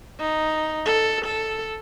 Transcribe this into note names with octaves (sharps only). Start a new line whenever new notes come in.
D#4
A4
A4